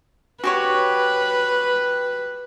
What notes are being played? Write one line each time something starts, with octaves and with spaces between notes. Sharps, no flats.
F#4 G4 B4 C#5